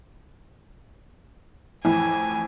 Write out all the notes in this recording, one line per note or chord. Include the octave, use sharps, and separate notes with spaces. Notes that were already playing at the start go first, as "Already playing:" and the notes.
F2 A2 E3 E4 G#5